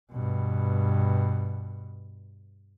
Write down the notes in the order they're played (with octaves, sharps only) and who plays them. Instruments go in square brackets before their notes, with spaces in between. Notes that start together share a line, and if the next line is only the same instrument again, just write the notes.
[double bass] G2 B2